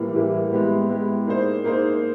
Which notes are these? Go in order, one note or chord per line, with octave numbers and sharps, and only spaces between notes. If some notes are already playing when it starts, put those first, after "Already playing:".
Already playing: A2 E3 G3 A#3
A2 E3 G3 A#3
G#3 B3 E4 G4
G#3 B3 E4 G4
A#3 D#4 G#4 C5
A#3 D#4 G#4 C5